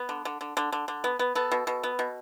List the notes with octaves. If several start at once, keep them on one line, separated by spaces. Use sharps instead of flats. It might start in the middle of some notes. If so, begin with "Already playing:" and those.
Already playing: B3
D3
D3
D3
D3
D3
D3
B3
B3
B3 A4
B2
B2
B3
B2